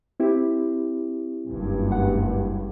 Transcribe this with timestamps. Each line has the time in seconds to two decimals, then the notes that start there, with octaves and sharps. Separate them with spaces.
0.20 C4 E4 G4
1.48 F#1 C#2 G2
1.92 F#5